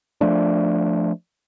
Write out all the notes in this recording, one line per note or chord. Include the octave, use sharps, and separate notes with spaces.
F3 A3 D4